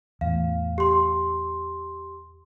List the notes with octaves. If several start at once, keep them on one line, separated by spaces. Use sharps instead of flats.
E2 A2 F5
G4 C6